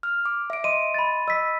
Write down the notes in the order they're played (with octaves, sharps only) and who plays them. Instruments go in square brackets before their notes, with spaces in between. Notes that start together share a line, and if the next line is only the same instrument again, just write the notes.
[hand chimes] F6
D6
E5 D7
[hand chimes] D#5 C6 [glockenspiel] D#7
[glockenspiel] B5 A6
[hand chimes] D#5 [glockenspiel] E6 B6